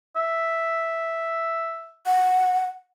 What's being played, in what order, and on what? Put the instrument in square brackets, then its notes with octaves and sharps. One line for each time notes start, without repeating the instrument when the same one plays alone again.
[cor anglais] E5
[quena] F#5